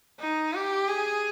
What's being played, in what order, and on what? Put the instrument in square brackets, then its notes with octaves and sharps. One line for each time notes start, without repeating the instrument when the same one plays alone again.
[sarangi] D#4
G4
G#4